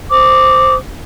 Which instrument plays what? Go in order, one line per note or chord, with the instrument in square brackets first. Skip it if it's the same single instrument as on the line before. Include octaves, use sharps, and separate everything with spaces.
[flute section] C5 D6 D#6